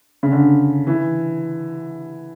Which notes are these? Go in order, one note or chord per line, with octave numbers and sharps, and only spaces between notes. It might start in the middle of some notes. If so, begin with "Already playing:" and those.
C#3
D3
E3